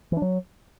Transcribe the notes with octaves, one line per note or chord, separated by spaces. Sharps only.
E3
D4
F#3